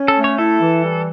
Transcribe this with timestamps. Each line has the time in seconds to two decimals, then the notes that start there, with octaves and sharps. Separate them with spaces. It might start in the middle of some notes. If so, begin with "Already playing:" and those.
Already playing: C#4
0.08 A4
0.16 A3
0.24 C#5
0.38 E4 A4
0.61 E3
0.84 G3